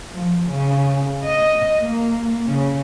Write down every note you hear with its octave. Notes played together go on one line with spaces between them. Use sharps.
F3
C#3
D#5
A#3
C#3